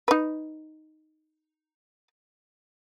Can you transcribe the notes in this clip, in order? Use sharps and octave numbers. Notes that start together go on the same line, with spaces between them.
D#4 B4